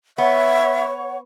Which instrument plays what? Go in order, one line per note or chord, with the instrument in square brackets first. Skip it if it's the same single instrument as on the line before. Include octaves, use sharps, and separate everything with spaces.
[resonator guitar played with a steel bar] B3 [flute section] C#5 F#5 C#6 [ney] E5